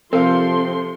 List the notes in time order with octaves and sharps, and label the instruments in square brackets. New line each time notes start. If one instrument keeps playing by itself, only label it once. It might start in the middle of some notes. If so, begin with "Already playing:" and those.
[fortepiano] C3 F5 [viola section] F3 A4 C6 [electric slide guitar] C4 [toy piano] A#4